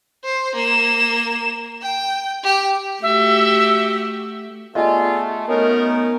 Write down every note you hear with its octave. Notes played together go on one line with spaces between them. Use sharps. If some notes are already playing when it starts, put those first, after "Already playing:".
C5
A#3 E7
G5
G4
A3 F#4 G4 E5
G3 A3 B3 F4 G#4 A4 D#5 G#5
F#3 A3 B3 C#4 D#4 A#4